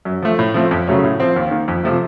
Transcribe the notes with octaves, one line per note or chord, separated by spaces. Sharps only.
F#2
F3 A3
A2
F3 A3 C4
F2
C#3 F#3 A3 C#4
A2
F3 C4
D#2
D#3 A#3
F2
C3 F3 A3